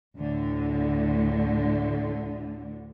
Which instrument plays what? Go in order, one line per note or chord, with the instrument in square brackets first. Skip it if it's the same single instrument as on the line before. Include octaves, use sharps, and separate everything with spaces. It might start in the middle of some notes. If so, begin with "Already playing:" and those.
[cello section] D2 A2 D3